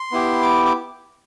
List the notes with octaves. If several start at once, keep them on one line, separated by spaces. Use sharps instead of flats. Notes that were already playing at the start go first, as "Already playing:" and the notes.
Already playing: C6
B3 E4 G4
D6
D6